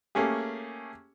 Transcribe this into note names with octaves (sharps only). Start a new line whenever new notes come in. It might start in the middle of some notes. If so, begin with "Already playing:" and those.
A3 A#3 C#4 G4 G#4